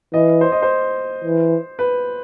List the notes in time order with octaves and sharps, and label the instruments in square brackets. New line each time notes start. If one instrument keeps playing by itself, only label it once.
[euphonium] E3 [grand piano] D#5
[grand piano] C5
D#5
C5
[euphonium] E3
[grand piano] B4